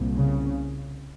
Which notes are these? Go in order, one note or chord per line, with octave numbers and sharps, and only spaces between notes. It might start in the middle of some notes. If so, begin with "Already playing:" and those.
Already playing: C2 A#2
C#3